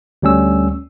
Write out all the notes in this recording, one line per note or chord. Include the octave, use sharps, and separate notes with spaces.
D2 G3 C#4 E6